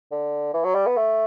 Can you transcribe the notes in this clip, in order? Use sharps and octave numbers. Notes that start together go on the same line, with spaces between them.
D3
E3
F#3
G3
B3
A3